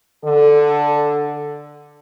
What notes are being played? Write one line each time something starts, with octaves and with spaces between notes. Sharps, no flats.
D3 A4